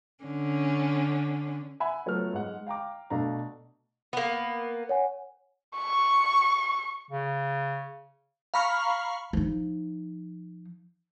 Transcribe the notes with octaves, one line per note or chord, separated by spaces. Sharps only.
D3 C#4
E5 F#5 G#5 B5
F3 F#3 A3 B3 F6
G#2 G#3 F#5
F5 G5 A#5 D6
B2 A3 D4 F5 A#5
A#3 B3
C#5 F#5 G#5
C#6
C#3
F5 A#5 B5 C#6 F6
F3 D#4